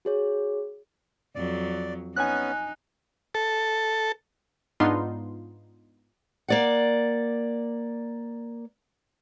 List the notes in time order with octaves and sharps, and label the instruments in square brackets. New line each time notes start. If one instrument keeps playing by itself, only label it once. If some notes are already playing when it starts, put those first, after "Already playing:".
[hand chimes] F#4 G#4 C#5
[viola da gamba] F2 F#3 [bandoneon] D5
[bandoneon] B3 C#4 [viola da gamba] D#4 [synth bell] G#5 F#6
[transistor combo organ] A4
[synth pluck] G#2 B3 D4 D#4 F4 C6
[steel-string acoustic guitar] A#3 D5 F#5